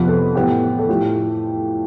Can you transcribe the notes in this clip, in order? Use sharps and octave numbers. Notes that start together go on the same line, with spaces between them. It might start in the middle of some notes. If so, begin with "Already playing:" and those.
Already playing: F2 C3 F3 B3 B4
A4
A2 E3 B3 G4
A4
A2 F3 A3 G4